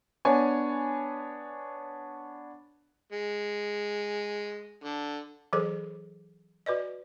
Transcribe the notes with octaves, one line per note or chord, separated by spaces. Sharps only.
B3 D4 C#5 G#5
G#3
D3
E3 F#3 G#4 A4 C5
F#4 B4 D5 D#5